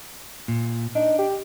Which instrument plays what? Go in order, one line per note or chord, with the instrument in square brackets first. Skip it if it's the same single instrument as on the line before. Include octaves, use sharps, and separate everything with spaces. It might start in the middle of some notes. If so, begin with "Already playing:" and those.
[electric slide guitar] A#2
[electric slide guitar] D4 [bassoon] D#4
[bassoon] G4